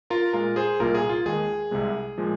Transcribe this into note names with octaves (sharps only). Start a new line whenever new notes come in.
F4 A#4
A#2 G#3 F4 A#4
G#4 C5
C2 A#2 A#3 F4 A#4
G#4
F4
D#2 D#3 G#3 G#4
C2 C3 G#3
A#2 F3 G#3